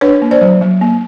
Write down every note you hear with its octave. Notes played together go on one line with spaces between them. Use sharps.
D4 B4 C#5
A#3
C5 D5
F#3
F#3
A#3